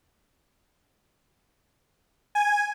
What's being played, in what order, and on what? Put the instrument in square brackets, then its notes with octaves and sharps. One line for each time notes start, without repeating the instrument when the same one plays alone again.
[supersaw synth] G#5